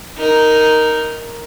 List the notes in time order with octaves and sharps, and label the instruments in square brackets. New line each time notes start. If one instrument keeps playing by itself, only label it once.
[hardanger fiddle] D#4 A#4